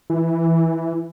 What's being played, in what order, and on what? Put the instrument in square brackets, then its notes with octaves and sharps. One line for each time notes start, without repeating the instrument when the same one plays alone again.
[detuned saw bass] E3